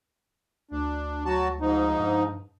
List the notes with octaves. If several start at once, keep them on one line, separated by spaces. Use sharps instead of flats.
D2 D4
F#3 F#4 A5
G#2 F3 D#4
G2